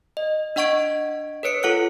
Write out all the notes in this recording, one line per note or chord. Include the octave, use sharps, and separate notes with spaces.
D#5
D4 D#5 F#5 C#6 G#6 D7
A#4 B4 C#5 C#7 D7
F4 A4 F#5 F#6 C#7